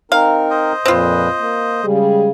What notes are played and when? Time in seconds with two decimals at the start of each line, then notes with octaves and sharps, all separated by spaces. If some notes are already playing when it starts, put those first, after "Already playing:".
0.12 C4 D#4 A#4 F5
0.50 C5 D#5
0.86 F2 A#2 C4 F4 B4
1.39 A#3
1.85 C#3 G3 G#3 G#4